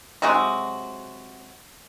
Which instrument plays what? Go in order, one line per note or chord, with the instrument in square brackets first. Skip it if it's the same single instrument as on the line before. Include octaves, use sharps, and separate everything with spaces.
[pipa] C3 F#3 G#3 F#4